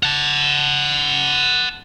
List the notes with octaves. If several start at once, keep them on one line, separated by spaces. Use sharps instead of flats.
F#5 A5